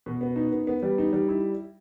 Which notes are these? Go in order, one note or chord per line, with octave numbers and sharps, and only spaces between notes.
B2
B3
D#4
B3
B3
G3
D#4
G3
E4